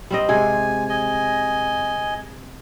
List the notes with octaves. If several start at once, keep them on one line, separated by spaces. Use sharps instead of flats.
G3 C4 D#5
C3 G#3 G#5
D#5 G#5